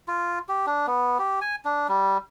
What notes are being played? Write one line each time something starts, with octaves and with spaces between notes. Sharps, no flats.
F4
G4
D4
B3
G4
G#5
D4
G3